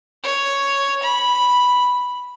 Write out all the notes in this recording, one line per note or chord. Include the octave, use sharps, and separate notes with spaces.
C#5
B5